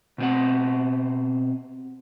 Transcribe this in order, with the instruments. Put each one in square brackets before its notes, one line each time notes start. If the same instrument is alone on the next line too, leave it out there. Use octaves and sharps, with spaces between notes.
[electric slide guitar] B2 C4 F#5